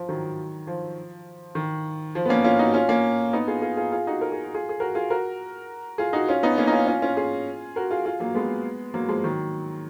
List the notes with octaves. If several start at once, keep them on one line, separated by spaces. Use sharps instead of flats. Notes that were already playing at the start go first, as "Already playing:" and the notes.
Already playing: F3
D#3 F#3
F3
D#3
F3
B3
A#3 C#4
C#4 F4
D#4 F#4
C#4 F4
A#3 C#4
B3 D#4
F4 G#4
F4 G#4
F4 G#4
F4 G#4
D#4 F#4
A#4
G#4
F#4
F4 G#4
G#4
F#4 A#4
F4 G#4
F#4 A#4
F4 G#4
D#4 F#4
C#4 F4
B3 D#4
A#3 C#4
D#4
C#4 F4
C#4 F4
C#4 F4
F4 G#4
F#4 A#4
F4 G#4
F4 G#4
F#3 A#3
G#3 B3
F#3 A#3
F3 G#3
D#3 F#3